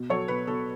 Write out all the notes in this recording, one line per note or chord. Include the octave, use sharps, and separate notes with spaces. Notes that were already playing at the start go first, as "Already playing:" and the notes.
Already playing: B2
F#3 A4 C#5
B2 B4
B2 A4